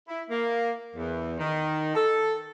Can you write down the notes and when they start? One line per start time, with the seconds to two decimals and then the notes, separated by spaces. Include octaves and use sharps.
0.08 E4
0.30 A#3
0.95 E2
1.38 D#3
1.94 A4